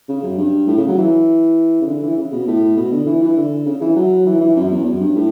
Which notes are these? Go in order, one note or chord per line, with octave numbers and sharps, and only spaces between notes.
C#3
F#2
G2
A2
C#3
F#3
E3
C#3
D3
E3
C#3
B2
A2
B2
D3
E3
E3
D3
C#3
E3
F#3
E3
E3
F#2
E2
F#2
G2
A2